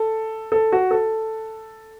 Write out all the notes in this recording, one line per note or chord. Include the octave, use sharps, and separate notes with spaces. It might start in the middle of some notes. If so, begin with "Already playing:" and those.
Already playing: A4
A4
F#4
A4